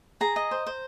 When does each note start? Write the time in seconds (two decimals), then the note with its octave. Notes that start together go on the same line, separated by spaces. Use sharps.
0.21 G#4 A#5
0.36 D#5
0.51 C5
0.67 C5